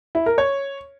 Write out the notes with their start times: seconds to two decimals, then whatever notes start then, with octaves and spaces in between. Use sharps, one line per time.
0.15 E4
0.26 A#4
0.38 C#5